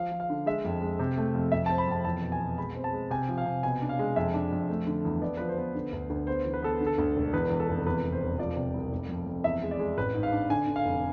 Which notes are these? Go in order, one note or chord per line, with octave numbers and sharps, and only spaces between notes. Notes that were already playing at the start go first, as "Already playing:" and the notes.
Already playing: F3 F5
F3
F5
D3
G#3 E5
F2
G#3
C3
A3
F2
F2 E5
C4 A5
B5
F2 A5
E2 A5
B2
G#5
B2
G#3 B5
C4
A5
G#3
C3 G#5
F3
F5
C3
B2 G#5
D4
F5
G#3
F2 E5
D4
F2
A3
D3
E2
B3 D5
F3 B4
C5
B3
D3
D2
D2
B3 C5
E3
B4
B3 A4
D3
A4
D2
E1
E2 B4
E2
A4
F1
E2 B4
E2
C5
E1
F3 D5
C3
C2
F1
F2
F2
E2 E5
G#3
D5
G#3
A1 B4
G#2
F5
D4
D3 G#5
D3
F5
F1